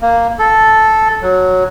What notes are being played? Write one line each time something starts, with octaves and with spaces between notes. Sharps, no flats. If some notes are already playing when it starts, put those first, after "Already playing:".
A#3
A4
F#3